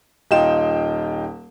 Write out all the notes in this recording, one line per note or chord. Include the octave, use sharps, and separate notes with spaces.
D#1 D#4 F4 G5 E7